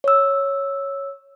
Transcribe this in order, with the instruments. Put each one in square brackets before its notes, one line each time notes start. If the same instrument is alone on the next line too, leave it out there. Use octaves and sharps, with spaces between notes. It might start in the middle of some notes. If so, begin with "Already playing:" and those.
[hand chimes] C#5 E6